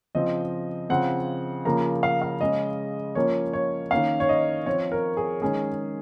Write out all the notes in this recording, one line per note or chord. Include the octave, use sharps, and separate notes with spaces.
C#3 F3 C4 D#5
C#3 F3 C4 F#5
C#3 F3 A#3 A#5
F5
F5
C#3 G#3 C#4 D#5
F3 A#3 C#4 C#5
C#5
D#3 A#3 C#4 F5
C#5
D#5
F3 C4 C#5
A#4
G#4
D#3 G#3 C#4 G#4